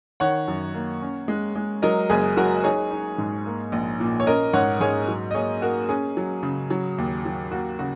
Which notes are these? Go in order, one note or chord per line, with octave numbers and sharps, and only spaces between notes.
D#3 C#5 F#5
F#2
A#3
C#4
G#3
G#3
F#3 A#4 D#5
F#1 G#4
F#3 F#4 A#4
D#4 G#4 C#5
D#4
G#2
A#3
A#1
A#2
C#5
C#4 A#4 D#5
G#2 C#5 F#5
G#2 G#4 C#5
F#3
D#5
A#3 G#4 C#5
A#3 F#4 A#4
C#4 G#4
F#3
C#3
F#3
D#2
F#3
A#3 F#4
C#3 F#4